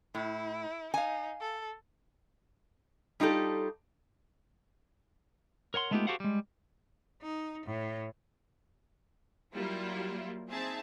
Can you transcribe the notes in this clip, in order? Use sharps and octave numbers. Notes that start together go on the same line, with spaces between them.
A2 E4
D#4 F5 G#5
A4
G3 D#4 F4 G4 A4
A#4 C#5 F#5 C6
G#3 A3 B3 D#4 F4 G4
F#4 G4 A4 C5 F5 F#5
G3 G#3
D#4
A2
F#3 G3 A#3 E4 F4
C4 D#4 G#4 E5 A5